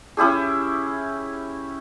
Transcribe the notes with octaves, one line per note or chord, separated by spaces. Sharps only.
C#4 E4 G4 G#4